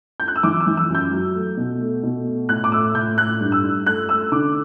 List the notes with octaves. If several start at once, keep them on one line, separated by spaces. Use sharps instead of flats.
G6
F#6
E6
E3 D6
E6
E3
E6
F#2
G6
F#3
A3
B2
A3
B2
A3
A2 F#6
D6
A2 E6
A2 G6
A3 F#6
G2
E6
G2
A3 F#6
A3 E6
D3 D6